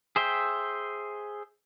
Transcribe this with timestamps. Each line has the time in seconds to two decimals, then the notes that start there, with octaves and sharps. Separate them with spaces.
0.16 G#4 C5 E5 G5